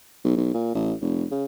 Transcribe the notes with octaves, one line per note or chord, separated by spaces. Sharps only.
B1
B1
A#2
A1
F1
C#3